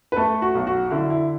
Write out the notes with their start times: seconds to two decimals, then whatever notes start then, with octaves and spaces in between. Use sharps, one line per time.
0.12 B4
0.16 A3 A4
0.42 F#4
0.55 B1
0.67 F#4
0.91 D3 E4
1.10 E4